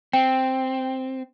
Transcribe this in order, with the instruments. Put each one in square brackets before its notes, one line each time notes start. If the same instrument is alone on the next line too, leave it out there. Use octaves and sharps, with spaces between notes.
[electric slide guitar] C4 [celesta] G5